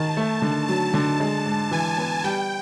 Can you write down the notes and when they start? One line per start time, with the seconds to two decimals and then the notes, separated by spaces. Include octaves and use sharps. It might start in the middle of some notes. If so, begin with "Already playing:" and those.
Already playing: D#3 A5
0.17 A3
0.42 D3
0.68 F#3 A5
0.94 D3
1.20 G#3
1.46 G#2
1.71 E3 G#5
1.98 B3
2.24 G3 G5